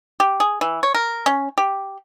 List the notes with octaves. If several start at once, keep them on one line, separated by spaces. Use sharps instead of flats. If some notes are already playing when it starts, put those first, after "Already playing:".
G4
G#4
E3
C#5
A#4
C#4
G4